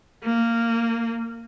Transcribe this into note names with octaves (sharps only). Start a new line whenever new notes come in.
A#3